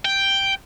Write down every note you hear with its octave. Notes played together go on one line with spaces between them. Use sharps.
G5